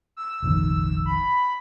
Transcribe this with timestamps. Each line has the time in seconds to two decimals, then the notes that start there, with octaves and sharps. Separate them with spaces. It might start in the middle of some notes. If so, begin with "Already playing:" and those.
0.17 E6
0.42 F1 A#1 D#3
1.06 B5